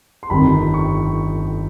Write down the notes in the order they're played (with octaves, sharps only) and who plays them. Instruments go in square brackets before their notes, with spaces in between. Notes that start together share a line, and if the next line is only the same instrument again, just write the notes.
[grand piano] C6
G1 F2 C3 D#3 G3 B5
C#6